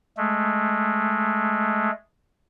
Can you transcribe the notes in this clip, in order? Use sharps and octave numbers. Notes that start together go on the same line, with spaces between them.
G#3 A3